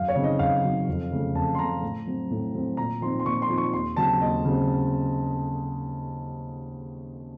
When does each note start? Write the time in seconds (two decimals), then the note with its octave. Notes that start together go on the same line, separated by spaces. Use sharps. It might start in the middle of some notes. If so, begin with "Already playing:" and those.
Already playing: F#2 F5
0.08 C#5
0.16 C#3 F#3 C4 D#4
0.24 D#5
0.39 F#2 F5
0.64 C#3 F#3 C4 D#4
0.88 F2
1.12 C#3 A3
1.34 F2 A5
1.55 C6
1.59 C#3 A3 A#5
1.82 A2
2.06 F#3 C4
2.31 A2
2.54 F#3 C4
2.77 A#2 A#5
3.01 F3 C4 D#4 C6
3.20 C6
3.25 A#2 C#6
3.42 C6
3.49 F3 C4 D#4
3.58 C#6
3.73 D#2 C6
3.97 C#3 F#3 C4 A5
4.21 D#2 D#5
4.45 C#3 F#3 C4